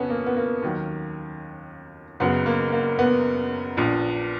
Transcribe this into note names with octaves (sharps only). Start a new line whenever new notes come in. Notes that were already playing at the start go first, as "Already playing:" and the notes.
Already playing: F2 C#3 B3 C#4
A#3
B3
A#3
D#2 D#3 F#3
F#1 F#2 C#3 F#3 B3
A#3
A#3
B3
A#1 A#2 F3